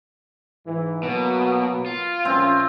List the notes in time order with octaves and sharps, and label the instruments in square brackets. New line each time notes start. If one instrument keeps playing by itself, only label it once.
[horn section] G#2 E3
[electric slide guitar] B2 [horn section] F#3 A#3 B3
[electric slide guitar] F4
[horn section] A#2 F3 C#4 [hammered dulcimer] C4 E5